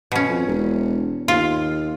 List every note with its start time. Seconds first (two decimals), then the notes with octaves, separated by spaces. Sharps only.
0.12 B2 C#4
0.29 F2
0.47 E1
1.28 D#2 F4